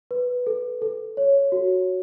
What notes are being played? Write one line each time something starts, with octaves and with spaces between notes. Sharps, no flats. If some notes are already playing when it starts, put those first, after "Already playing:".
B4
A4
A4
C#5
F#4